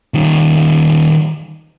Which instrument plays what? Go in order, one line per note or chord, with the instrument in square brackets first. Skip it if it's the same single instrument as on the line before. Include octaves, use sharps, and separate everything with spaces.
[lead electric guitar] D#3 G3